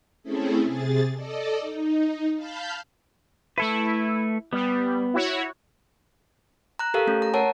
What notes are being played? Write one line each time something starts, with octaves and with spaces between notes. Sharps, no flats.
A3 C4 C#4 E4 G#4 A4
C3 G#4 A6
A4 D5 D#5
D#4
F5 A5 B5 F6 G6
A3 E4 A4 B4
G3 B3
E4 F#4 C#5
A#5 F#6
G4 A4 A#4 F5
A3 C#4
A#5
A#4 C#5 F#5 A5 A#5